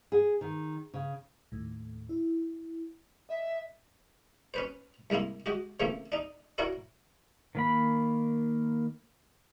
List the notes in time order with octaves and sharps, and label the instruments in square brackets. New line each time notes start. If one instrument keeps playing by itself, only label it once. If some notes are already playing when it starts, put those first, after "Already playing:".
[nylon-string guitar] G#4
D#3
C#3
[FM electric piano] D#2 A2
E4
[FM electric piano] D#5 [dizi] E5
[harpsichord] C#4 B4 C5
C2 G#3 A#3 E4 C6
G#3 F#4 G4
C#3 E3 F3 A3 A#3 C4
D4 D#4
D4 E4 F#4 A#4 C#5
[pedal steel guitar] D#3 A#3 B5